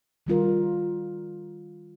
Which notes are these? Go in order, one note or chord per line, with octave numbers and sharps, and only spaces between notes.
D#3 G3 F4 A#4